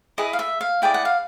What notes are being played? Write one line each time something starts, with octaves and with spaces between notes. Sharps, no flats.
E4 G#4 B4 D#5
F5
E5
F5
E4 G#4 B4 D5 G5
F#5
F5